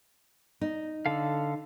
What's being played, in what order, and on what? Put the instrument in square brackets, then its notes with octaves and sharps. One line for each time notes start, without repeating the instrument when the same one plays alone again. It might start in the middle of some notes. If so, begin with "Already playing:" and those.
[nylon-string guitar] D#4
[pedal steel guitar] D3 A4 F5